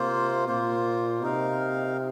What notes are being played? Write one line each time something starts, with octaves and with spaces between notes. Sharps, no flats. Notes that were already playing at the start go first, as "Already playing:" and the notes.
Already playing: C3 A#3 F4 C5
A#2 A#3 F4 C5
C3 D#4 A#4 F5